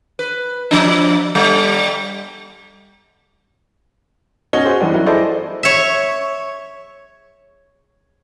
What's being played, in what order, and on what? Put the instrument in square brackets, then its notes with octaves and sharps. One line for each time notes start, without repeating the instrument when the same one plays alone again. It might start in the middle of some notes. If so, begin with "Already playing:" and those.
[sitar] B4
F3 D4
G3
[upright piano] B2 C#4 D#5 F#5 G7
F#4 G#4 C5
G2 E3 D4 D#4
F#3 E4 F#4 A#4
E4 G#4 A4 C5 D5 D#5
[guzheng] C#5 E5